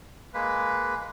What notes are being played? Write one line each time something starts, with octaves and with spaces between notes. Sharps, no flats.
G#3 A#3 B4